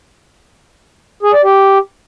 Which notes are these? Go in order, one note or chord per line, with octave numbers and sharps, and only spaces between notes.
G#4
D5
G4